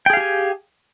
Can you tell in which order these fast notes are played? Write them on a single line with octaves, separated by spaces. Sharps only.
G5 G#4 F5 G4 G#5